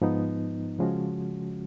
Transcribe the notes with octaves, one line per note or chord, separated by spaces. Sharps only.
G#2 F3 B3 D#4
C#3 F3 G#3 C#4 F#4